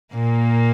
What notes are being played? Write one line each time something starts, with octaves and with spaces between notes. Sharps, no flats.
A#2 A#3